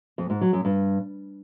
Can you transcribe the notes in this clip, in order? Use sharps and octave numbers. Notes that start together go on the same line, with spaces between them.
F2
G#2
F#3
F#2
G2